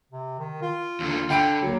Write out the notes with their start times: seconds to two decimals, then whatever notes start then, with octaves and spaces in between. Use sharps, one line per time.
0.12 C3
0.39 D#3
0.62 F4
1.00 D#2 D3
1.30 D3 G5 B5 D7
1.62 F#3 A#3